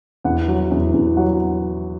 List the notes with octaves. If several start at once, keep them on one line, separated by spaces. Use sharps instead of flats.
E2 F#5
F#3
E2
E2
F#3 F#5